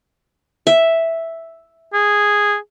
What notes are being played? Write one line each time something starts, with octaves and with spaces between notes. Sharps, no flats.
E5
G#4